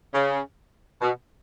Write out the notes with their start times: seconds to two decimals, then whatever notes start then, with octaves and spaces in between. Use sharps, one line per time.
0.14 C#3
1.02 B2